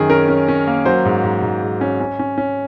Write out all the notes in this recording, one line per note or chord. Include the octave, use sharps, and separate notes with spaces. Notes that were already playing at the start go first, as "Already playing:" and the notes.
Already playing: F#2 D#3 G#4
C#4 A#4
C#4
C#4
A#3
F#3 C5
G#2
G#2
G#2
G#2
C#4
C#4
C#4
C#4